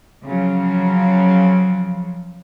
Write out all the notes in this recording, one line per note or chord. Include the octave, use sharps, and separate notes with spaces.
C#3 F3 F#3